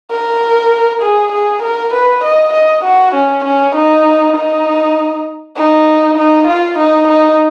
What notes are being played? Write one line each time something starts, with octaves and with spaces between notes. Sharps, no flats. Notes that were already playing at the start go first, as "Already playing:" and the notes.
A#4
G#4
G#4
A#4
B4
D#5
D#5
F#4
C#4
C#4
D#4
D#4
D#4
D#4
F4
D#4
D#4